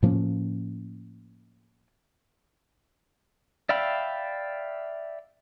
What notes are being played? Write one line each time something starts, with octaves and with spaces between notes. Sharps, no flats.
A2 F3 A#3 C#4
D5 E5 F5 G5 B5